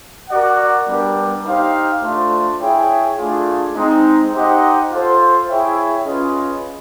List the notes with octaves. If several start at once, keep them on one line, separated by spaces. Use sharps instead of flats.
F#4 A#4 D5 F#5
G3 B3 D4 G4 A#4
D#4 G4 C5 F5
A3 D4 F4 A4 C5
E4 G#4 C#5 E5 G5
A3 D4 F4 G#4
G#3 C4 D#4
D#4 G4 C5 D#5 F#5
F4 A4 C5
E4 G#4 C#5 E5 G5
C#4 F4 G#4 B4 D#5